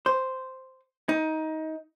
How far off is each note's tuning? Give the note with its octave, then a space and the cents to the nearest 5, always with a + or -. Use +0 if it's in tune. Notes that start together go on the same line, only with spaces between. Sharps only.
C5 -5
D#4 +20